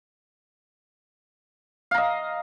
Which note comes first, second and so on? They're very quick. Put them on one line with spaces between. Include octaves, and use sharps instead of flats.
F5 A#5 D#5